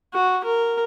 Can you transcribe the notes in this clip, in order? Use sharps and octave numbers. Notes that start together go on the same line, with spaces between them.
F#4
A#4